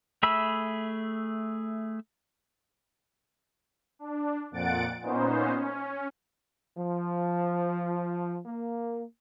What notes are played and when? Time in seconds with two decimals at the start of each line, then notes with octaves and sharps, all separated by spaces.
0.23 A3 G#4 E5 B5 E6
3.99 D4
4.51 F2 A#2 F#5 A6 D7
5.01 A#2 B3 C#4 D#4 C5
5.56 C#4
6.78 F3
8.46 A#3